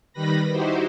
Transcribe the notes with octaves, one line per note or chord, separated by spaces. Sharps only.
D#3 G3 B4 B5 A#6
D#4 E4 F#4 G4 C5